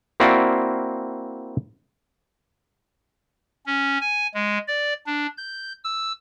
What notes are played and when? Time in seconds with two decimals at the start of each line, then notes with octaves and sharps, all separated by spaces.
0.20 A#3 C4 E4 F#4 D5 F5
3.66 C#4
4.01 G#5
4.34 G#3
4.68 D5
5.07 D4
5.37 G6
5.84 E6